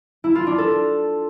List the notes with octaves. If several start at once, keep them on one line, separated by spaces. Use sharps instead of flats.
E4
F4
D4
A4